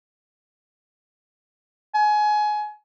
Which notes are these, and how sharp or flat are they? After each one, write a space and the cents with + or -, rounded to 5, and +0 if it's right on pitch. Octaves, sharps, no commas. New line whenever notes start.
G#5 +25